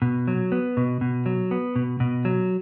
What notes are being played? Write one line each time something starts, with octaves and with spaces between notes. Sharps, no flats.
B2
F#3
B3
B2
B2
F#3
B3
B2
B2
F#3